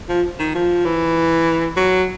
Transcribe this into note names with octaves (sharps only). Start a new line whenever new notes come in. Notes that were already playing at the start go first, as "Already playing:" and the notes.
F3
D#3
F3
E3
F#3